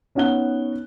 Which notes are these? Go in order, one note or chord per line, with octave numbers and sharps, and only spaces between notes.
B3 C#4 D#4 F#5 F#6 G7